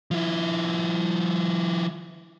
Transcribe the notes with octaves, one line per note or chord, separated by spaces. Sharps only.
F3 E4